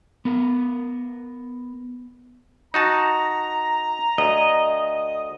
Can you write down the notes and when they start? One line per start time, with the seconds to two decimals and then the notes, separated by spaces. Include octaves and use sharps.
0.25 B3 A#4
2.74 D#4 F#4 A5 A#5
4.18 D2 D#5